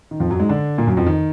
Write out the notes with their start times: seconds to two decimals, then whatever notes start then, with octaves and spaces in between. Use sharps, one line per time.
0.11 D#3
0.20 F2 F3
0.30 F#2 F#3
0.40 G#2 G#3
0.49 D3 D4
0.78 A#2 A#3
0.87 F#2 F#3
0.97 F2 F3
1.07 D#3